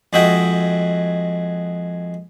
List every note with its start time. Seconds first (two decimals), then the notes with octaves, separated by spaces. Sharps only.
0.13 F2 G#3 F#4 D#5 E5 G5